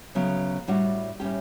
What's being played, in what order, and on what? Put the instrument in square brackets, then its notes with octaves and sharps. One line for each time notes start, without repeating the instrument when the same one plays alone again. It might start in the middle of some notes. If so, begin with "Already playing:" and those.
[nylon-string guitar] D2 C#3 F#3 B3
A2 G3 D4 F#4
A2 G3 C#4 G4